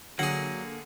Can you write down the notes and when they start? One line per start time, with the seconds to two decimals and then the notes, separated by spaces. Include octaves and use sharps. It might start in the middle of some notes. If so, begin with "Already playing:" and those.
0.19 D3 F#3 A#3 G#4 F#5